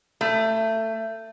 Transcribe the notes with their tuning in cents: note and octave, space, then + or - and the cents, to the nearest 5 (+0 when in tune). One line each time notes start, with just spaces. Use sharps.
A3 +20